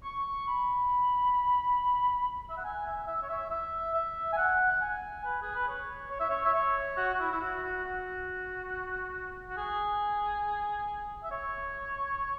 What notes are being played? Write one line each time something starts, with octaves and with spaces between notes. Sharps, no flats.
C#6
B5
E5
F#5
G#5
E5
E5
C#5
E5
E5
E5
G#5
F#5
F#5
G#5
B4
G#4
B4
C#5
C#5
E5
C#5
E5
C#5
F#4
F#4
E4
E4
F#4
F#4
F#4
F#4
G#4
E5
C#5